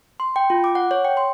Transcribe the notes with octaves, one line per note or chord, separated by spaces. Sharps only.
C6
G5
F4
D6
F#5
C#5
G5
C6